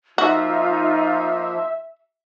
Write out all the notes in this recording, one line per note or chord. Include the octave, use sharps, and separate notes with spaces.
F3 A#3 D#4 F4 F#4 E5